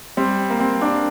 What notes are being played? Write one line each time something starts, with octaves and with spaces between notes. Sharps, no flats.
G3 C4
A#3
G3 C4
A#3 D4